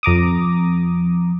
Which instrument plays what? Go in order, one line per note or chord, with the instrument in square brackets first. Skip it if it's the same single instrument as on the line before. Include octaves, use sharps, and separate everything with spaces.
[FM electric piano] F2 A#5 D6 D#6